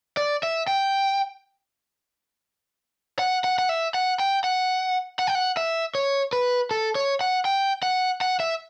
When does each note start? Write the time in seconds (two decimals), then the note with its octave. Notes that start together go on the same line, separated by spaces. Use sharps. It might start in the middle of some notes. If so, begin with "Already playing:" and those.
0.17 D5
0.43 E5
0.67 G5
3.19 F#5
3.44 F#5
3.59 F#5
3.69 E5
3.94 F#5
4.20 G5
4.44 F#5
5.19 F#5
5.27 G5
5.35 F#5
5.57 E5
5.95 C#5
6.33 B4
6.71 A4
6.95 C#5
7.21 F#5
7.45 G5
7.83 F#5
8.21 F#5
8.40 E5